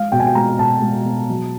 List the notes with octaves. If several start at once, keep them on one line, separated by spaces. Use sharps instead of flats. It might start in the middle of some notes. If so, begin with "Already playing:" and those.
Already playing: G#3 F5
B2 G5
G#5
G5
G#3 A#5
B2 A5
G#3
B2
F#3